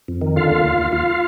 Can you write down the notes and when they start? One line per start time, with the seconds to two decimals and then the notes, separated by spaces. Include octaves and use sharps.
0.08 F2
0.21 D#3
0.36 D3 F4 F5
0.51 D#2
0.64 D#2
0.78 D#2
0.92 D#2 F4 F5